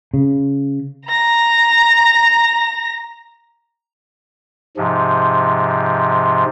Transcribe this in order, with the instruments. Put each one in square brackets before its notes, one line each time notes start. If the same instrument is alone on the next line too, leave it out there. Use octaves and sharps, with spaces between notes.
[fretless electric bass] C#3
[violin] A#5 A#6
[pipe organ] G#2 C3 F3